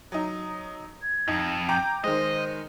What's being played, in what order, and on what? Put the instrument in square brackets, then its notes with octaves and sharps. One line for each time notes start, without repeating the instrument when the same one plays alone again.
[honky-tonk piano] F#3 D#4 [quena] D#6
[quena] G#6
[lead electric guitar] F2 [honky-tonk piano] D#4
[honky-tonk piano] G5 A#5 D6 [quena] G6
[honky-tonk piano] D#3 G#3 [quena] C5 [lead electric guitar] D#5